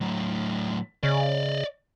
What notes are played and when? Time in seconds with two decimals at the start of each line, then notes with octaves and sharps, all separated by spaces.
0.01 A2 F#3
1.03 C#3 D5 D#5